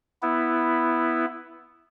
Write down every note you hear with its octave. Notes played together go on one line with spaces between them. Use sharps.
B3 E4